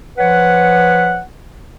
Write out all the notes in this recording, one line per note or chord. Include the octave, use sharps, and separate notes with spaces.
F3 B4 C#5 F#5